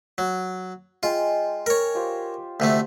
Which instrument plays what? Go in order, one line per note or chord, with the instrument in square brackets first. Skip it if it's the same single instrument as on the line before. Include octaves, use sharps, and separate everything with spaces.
[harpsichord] F#3
[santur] G#3 G5 [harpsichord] F4
[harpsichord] A#4 C#5
[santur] F4 G4 C5
[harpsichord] D2 C3 A3